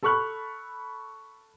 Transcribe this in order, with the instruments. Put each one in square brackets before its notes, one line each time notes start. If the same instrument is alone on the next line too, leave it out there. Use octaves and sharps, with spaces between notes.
[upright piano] A4 B5 C#6 F6 F#6